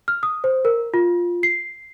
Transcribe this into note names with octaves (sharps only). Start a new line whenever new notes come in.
F6
D#6
C5
A#4
F4
C7